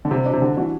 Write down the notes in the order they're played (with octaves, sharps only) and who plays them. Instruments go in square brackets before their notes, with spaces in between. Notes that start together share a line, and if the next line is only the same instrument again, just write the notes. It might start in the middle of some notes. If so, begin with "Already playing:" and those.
[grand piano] D3
[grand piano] C3 [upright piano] G3
[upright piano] D4 F#4
[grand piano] C3
[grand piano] D3 [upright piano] G3
[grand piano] E3 [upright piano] D4 F#4